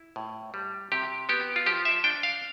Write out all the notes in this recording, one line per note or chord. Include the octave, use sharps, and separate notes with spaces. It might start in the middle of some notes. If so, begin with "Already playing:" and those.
Already playing: E4
A2
G3
C3 G4
B3 G4
F4
F3 G4
E5
D4 G5
F5